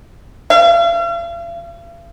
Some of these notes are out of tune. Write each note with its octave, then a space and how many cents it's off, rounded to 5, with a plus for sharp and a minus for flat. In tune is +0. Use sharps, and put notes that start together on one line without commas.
F5 -45